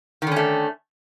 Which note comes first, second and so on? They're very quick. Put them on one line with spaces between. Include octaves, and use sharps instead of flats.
D#3 D3 C#4 A3